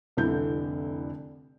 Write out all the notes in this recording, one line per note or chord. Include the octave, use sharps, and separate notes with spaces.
F1 C2 D3 E4 G6